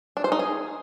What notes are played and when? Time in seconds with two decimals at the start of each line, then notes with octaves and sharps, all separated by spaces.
0.17 D4
0.24 C5
0.32 D#4
0.39 G#4